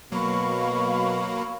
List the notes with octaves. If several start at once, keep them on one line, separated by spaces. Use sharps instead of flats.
B2 F#3 A#3 F5 B5 C#6